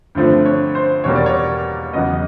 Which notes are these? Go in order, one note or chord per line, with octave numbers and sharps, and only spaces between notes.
G2 D3 F3 A3 C4
C#5
C5
E2 B2 G3 A#3 C#5
D5
C#5
E2 C#3 F#3 B3 D#5